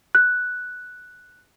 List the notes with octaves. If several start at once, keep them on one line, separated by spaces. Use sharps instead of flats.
F#6